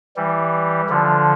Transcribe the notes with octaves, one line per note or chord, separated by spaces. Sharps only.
E3 G3
D3 F3